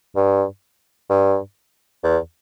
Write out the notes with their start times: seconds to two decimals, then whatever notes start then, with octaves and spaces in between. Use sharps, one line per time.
0.16 G2
1.10 G2
2.04 E2